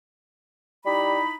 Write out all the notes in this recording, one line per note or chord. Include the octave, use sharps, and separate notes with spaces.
G3 D#4 E4 B5